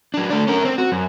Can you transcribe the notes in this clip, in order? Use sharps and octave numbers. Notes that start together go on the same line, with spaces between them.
F#3 D4
A3 D5
C#4 A#4
C4
F#4
F#2